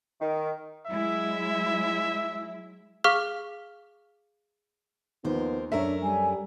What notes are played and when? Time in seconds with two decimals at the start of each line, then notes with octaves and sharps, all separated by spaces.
0.21 D#3
0.87 F#3 G#3 E4 E5
3.04 G#4 F5 C#6 D6 F6 B6
5.25 D#2 F3 B3 D#4 A#4 C5
5.72 F#2 A3 D4 A#4 C#5 E5
6.03 G3 G#5